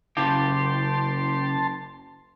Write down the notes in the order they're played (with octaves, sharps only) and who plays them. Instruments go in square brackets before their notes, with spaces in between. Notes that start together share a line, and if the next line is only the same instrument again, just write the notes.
[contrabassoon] F#1 [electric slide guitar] C#3 E4 F5 [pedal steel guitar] G4 [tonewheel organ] A5 C6